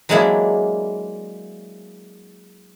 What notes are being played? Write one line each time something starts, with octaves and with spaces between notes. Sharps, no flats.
F#3 G#3 A#3 D4 E4 G#4